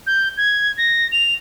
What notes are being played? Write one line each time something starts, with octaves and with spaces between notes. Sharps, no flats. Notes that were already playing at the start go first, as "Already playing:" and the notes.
G6
G#6
A#6
F7